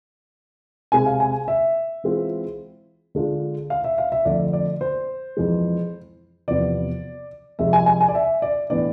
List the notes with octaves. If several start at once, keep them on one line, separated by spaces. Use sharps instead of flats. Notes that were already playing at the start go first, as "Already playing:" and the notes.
C3 G#3 C4 G#5
F5
G#5
E5
E3 G#3 C4 F4
D3 G#3 D4 F4
F5
E5
F5
E5
F2 D3 A3 D5
D5
C5
F2 E3 G#3
E2 C3 F3 B3 D5
F2 C3 G#3 E5
G#5
G#5
G#5
D5
E5
D5
A2 E3 B3 D4 D5